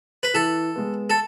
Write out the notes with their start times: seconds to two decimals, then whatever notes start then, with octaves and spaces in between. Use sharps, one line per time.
0.23 B4
0.34 E3 A4
0.76 G#3 B3
1.10 A4